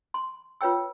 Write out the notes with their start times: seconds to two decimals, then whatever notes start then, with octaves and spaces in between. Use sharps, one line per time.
0.14 C6
0.61 F4 B4 C#5 G5 E6